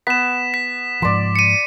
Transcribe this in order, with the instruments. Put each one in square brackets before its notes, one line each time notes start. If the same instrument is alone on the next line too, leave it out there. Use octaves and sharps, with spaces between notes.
[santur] B3 [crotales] B6 E7
[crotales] B6
[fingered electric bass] G#2 F3 [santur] D5 C6
[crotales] C#7 D#7